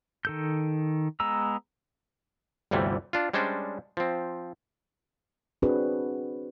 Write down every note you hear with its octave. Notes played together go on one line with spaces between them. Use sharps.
D#3 A4 G6
G#3 B3 A#5 E6
G1 D2 C3 E3 G3
D4 F4
G3 G#3 C#4 D4 C5
F3 C4
C4 D4 F#4 G#4 B4